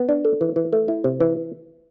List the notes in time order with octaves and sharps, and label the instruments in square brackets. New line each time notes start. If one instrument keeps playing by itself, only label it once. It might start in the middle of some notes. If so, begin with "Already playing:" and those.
Already playing: [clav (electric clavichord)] B3
D4
A4
E3
E3
A3
E4
C3
E3